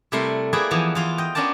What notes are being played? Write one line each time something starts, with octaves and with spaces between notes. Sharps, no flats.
C3 G3 A3 E4 A#4 C6
A#3 E4 G#4 B4 D5 G5
E3 F3 B3
E3 F4 F5
D#5 G5
B3 C#4 D4 A#4 D5 A5